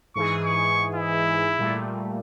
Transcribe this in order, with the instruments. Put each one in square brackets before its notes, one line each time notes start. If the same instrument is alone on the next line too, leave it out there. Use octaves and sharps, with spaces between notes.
[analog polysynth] G#2 E3 G#4 [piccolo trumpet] C#6
[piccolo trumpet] C#6
E4
[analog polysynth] A#2 G3 A3